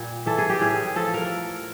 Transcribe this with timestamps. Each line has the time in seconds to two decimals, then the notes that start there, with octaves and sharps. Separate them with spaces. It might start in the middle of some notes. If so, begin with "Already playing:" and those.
Already playing: A#2 G3
0.26 E3 A4
0.38 G#4
0.49 G4
0.61 A2 G#4
0.96 F3 A4
1.14 A#4